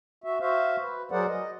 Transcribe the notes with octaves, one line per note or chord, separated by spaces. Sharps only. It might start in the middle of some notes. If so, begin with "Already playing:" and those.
F#4 E5
F#4 C5 E5 F5
B4
F#3 G#4 A#4 C5 D5 F#5
D#5